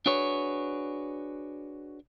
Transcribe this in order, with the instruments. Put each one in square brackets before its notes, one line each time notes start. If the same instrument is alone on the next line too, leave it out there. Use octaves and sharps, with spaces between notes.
[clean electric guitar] D4 F#4 G#4 B4 C#5